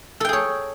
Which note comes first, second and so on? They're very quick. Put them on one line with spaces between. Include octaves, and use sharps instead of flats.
A4 G5 G#4 C#5